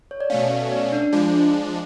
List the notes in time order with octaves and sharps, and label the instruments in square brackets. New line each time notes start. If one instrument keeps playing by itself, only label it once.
[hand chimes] C#5
D5
[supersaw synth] B2 A3 C#4 [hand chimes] F5
[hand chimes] F5
D5
D4
D4
[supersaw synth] F3 G#3 D4 [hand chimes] F4